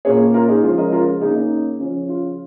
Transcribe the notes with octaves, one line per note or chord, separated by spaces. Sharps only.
A#2 A#3 C#4 G#4 C#5
F4 A#4
D#4 G#4
C#3 F3 G#3 C#4 F4
A#4 D#5
F4 A#4
C#3 A#3 C#4 D#4 G#4
D#4
C#3 F3 C#4
F4